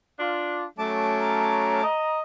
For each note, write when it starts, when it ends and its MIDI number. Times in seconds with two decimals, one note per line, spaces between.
0.19 0.65 62
0.19 0.65 65
0.78 1.82 54
0.78 1.83 57
0.78 1.82 61
0.78 1.83 81
0.78 1.83 86
1.20 2.19 82
1.83 2.23 75